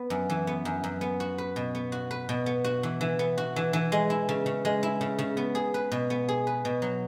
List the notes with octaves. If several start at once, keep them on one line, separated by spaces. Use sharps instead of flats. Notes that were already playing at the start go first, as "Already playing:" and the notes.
Already playing: B3
F#2
E3
B3
F#2
F#2
B3
F#4
B4
B2
B3
F#4
B4
B2
B3
F#4
E3
E3
B3
F#4
E3
E3
G#3
E4
C#3
C#3
G#3
E4
C#3
C#3
B3
G#4
B4
B2
B3
G#4
B4
B2
F#3